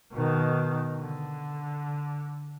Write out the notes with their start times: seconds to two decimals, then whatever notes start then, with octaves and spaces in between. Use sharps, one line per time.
0.12 B2 D#3
0.98 D3